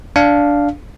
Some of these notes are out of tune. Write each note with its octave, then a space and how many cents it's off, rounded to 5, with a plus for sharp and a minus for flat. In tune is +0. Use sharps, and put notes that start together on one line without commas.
D4 -10 F5 +0